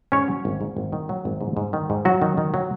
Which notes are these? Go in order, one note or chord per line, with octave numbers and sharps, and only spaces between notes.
G#2 C#4 C#5
F#3
G#1
G#2
G#1
D#3
F#3
G#1
G#2
G#2
D#3
G#2
F#3 F#4
D#3
D#3
F#3